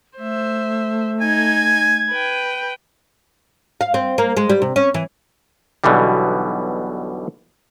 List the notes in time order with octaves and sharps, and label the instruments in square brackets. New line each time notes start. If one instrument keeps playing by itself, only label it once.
[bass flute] A3 [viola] C5 E5
[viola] D#4 [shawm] G#5 [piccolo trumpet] G#6
[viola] B4 G5
[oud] F5
C4
A#3
G#3
G3
C3
C#4
E3
[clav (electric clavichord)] B1 B2 D3 E3 G3